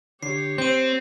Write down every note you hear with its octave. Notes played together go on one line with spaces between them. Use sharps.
D3 G4 C#5 C7
C4 C5 G6 D#7